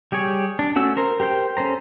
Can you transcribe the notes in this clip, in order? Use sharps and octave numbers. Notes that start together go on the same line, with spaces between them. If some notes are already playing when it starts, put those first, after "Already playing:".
G3 G4 G#4 C#5
D4
A3 C#4 F#4 E6
A#4 C5 A#5
G4 A#4 C5 G5
C#4 A4 C5 A#5